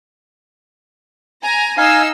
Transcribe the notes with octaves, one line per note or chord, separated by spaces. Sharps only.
G#5 A#5
D#4 F5 G#5 E6 C7